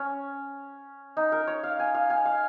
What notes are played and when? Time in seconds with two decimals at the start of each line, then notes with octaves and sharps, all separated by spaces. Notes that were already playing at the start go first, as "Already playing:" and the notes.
Already playing: C#4
1.17 D#4
1.32 A#4
1.47 C#5
1.63 F5
1.79 G#5
1.94 F5
2.10 G#5
2.25 F5